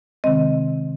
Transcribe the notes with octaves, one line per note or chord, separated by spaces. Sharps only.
C3 D#3 G#3 C4 D#5